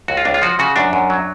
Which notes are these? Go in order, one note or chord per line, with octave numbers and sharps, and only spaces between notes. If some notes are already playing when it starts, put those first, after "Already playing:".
C#2 F#4
F4
C#2 D4
F4
F3 F#4
C#3 F#4
F#2 D4
F#2
F#3